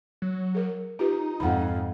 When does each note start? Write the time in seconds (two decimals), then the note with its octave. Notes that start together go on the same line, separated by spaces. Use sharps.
0.22 F#3
0.55 G#4 A#4
0.99 D#4 F4 G4 B4
1.40 F2 G#2 F#5 B5